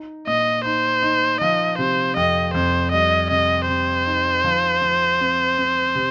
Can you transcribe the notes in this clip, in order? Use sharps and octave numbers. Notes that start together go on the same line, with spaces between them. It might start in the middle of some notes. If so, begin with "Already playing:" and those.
Already playing: D#4
A#2 D#5
D#4 C5
D#4
F3 D#5
C3 C5
F2 D#5
F2 C5
G3 D#5
C3 D#5
C3 C5
D#4
F3
F3
C4
C4
C3